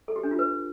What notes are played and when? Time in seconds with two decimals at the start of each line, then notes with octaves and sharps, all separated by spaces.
0.08 A4
0.16 G4
0.23 D4
0.31 F4
0.39 B4